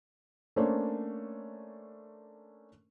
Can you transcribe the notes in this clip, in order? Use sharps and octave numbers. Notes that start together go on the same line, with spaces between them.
A3 A#3 C#4 D4 C5 C#5